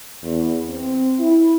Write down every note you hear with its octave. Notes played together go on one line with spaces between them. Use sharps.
E2
C4
E4